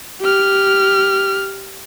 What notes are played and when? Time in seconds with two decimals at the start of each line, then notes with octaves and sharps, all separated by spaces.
0.21 G4 F6